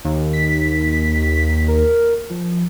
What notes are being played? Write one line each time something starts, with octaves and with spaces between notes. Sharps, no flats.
D#2
B6
A#4
F3